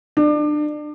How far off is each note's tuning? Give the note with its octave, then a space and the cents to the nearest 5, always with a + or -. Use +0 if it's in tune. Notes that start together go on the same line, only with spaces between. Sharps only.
D4 +30